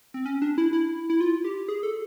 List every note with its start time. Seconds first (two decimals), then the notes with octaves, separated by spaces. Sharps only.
0.14 C4
0.26 C#4
0.42 D4
0.58 E4
0.73 E4
1.10 E4
1.21 F4
1.44 G4
1.68 G#4
1.83 A4